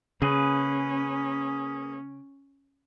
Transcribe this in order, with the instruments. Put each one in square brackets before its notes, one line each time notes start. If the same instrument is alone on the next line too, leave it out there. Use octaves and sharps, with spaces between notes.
[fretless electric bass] C#3 [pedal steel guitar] A#3 G#4 B4 [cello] C#4